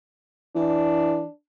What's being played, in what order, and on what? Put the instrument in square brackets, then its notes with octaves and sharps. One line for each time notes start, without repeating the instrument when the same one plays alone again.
[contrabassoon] E3 [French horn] D4